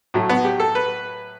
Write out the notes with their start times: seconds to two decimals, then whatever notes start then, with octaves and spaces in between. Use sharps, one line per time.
0.14 A2 F#3 A3
0.29 B3
0.45 G4
0.60 A4
0.75 B4